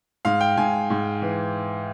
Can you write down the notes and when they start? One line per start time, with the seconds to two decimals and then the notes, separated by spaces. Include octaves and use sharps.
0.25 G#2 F5
0.41 G5
0.57 G#2 G#5
0.90 G#2
1.22 E3